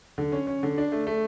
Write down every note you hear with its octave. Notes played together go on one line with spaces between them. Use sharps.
D3
C#4
C#4
D3
D4
A3
A3